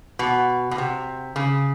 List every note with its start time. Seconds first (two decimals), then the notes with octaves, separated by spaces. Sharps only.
0.19 B2
0.71 B2
0.78 C3
1.36 C#3